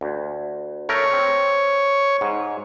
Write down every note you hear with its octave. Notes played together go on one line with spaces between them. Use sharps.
D2
A3 A#4 C#5
C4
G#2